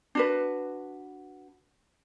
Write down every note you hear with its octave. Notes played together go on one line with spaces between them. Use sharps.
D4 F#4 B4